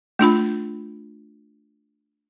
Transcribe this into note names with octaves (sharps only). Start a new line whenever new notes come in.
A3 D4 F4 B5